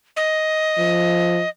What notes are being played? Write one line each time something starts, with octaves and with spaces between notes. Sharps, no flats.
D#5
F3